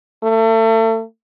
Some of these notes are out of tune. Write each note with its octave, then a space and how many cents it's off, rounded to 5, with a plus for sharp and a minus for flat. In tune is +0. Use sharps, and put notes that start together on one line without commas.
A3 +35